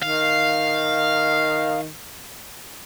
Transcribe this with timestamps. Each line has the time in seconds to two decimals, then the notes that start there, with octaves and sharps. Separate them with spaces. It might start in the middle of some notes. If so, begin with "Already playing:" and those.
0.02 D#3 F5